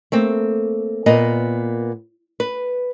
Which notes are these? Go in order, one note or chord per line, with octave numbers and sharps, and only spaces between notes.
A3 A#3 C4
A#2 B3 A#4 D#5
B4